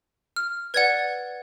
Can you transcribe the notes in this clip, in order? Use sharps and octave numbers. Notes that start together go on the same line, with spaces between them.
F6
B4 D5 F#5 G#6